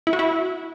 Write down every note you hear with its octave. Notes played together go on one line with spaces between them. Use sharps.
E4
F#4
E4